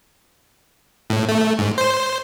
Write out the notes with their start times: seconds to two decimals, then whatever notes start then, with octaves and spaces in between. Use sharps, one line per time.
1.10 A2
1.28 A3
1.59 G#2
1.78 C5